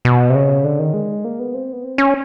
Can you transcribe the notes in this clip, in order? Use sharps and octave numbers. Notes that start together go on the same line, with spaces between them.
B2
C3
C#3
D3
D#3
G#3
A#3
B3
C4
B3
C4
C#4